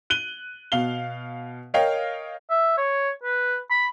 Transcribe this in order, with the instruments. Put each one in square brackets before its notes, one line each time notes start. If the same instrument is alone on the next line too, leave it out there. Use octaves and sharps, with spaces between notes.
[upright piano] F#6 D#7 G7
B2 F5 G7
A#4 C#5 D#5 F5 G5
[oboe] E5
C#5
B4
B5